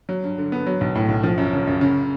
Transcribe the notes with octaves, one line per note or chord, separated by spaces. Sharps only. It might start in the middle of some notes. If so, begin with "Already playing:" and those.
F#3
G2
D3
B3
F#3
B1
A2
B1
F3
F#2
C#3
F#2
C#3